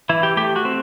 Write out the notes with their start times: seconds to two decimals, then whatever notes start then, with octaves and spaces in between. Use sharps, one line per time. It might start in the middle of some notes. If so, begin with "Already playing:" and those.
0.09 E3 E4
0.23 G4
0.37 A3 G4
0.56 F#4
0.65 C4